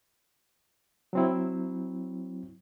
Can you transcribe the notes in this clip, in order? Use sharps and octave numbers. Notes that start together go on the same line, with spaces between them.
F#3 C4 E4